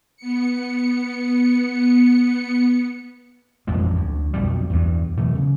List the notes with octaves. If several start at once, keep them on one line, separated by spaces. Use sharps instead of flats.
B3 C#7
A1 F2 B2 G#3
D2
B1 F2 B2 G3
E2 G2
B2 E3 F#3 A3
C#3